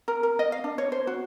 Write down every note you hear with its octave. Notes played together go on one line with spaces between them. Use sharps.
A#4
A#4
D#5
F5
D4
C#5
C5
F#4